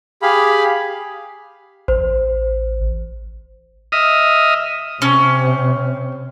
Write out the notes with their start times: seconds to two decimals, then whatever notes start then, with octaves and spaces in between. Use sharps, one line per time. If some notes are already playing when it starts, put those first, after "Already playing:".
0.22 G4 G#4 F5 B5
1.88 A1 C5
3.92 D#5 E5 D#6 F6
5.02 C3 C#4